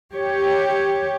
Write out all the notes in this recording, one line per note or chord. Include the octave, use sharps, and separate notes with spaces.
G4 C#5